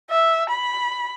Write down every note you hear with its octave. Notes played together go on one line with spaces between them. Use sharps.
E5
B5